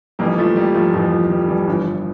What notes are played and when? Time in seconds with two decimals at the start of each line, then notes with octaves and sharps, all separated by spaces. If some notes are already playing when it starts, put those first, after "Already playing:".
0.19 F1 F2 E3 G3 A#3
0.38 F3 A3
0.56 G3 A#3
0.74 F3 A3
0.94 F1 F2 E3 F3 A3
1.12 F3
1.30 E3 G3
1.48 E3 G3
1.67 G1 G2 E3 F3
1.86 E3